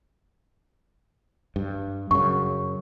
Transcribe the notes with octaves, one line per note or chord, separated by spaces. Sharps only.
G2
F#2 C#3 C#6